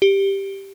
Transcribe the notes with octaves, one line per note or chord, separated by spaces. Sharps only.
G4